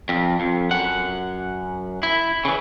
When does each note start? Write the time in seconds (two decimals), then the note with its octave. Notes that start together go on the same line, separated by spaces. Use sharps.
0.09 F2
0.40 F2
0.71 F#2 F#5
2.03 E4
2.45 C#3 E3